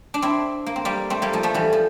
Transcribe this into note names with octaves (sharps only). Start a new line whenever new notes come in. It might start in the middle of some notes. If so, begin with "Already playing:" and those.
D4
C4 E4
A#3
C4
G3 A#3
A3 C4
G3 A#3
F3 A3
F3 A3
E3 G3
F3